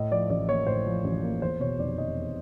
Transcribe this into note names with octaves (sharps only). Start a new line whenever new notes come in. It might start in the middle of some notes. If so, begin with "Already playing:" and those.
Already playing: A2 D#5
F3 D5
A1 D5
A#3 C#5
A2 C5
F3
A1
A#3
E2 C5
B2 C#5
F1 D5
F1 D#5
E2